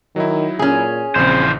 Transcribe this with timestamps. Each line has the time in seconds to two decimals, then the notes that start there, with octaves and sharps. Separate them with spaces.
0.16 D#3 F#3 D#4 E4
0.59 A#2 C#4 G#4
1.15 A#1 C#3 E3 C4 C5